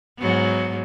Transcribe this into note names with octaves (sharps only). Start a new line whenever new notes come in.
G#2 F#3 B3